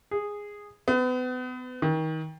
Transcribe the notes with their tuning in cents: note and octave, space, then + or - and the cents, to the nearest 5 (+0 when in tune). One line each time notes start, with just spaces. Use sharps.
G#4 -10
B3 +35
D#3 +30